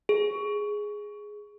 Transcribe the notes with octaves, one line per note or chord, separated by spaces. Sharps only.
G#4